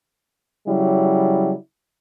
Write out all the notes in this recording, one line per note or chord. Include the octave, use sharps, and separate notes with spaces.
C#3 F#3 G3 E4